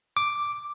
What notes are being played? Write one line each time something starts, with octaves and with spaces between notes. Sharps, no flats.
D6